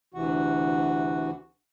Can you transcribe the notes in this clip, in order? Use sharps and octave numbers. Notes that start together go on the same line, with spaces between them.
D2 C3 E3 F#4 F#5